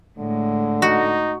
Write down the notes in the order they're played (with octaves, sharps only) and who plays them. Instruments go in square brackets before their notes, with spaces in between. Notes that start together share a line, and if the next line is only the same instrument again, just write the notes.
[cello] A2 G#3 [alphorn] D3
[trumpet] D#4 [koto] F#4